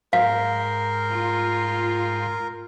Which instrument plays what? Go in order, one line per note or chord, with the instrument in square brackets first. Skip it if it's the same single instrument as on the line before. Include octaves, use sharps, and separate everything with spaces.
[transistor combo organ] G#2 G5 C6 [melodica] A#4 [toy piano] F5
[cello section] F4